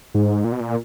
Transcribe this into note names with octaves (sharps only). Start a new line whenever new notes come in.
G#2
A#2
B2
A#2